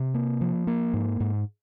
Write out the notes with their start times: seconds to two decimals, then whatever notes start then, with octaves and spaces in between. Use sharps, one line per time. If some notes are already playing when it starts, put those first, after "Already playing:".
Already playing: C3
0.14 A#3
0.41 F3
0.67 A#3
0.94 G#2
1.20 G#2